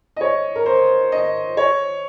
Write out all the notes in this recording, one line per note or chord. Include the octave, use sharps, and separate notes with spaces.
D#5
C#5
A#4
C5
D#5
C#5